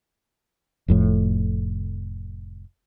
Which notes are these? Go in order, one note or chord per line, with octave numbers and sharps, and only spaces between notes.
F1 F2 A2